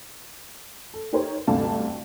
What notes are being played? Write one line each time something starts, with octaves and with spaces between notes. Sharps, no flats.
A4
D#4 G4 A#4 C5 C#5
G1 D2 C3 D4 F5 A5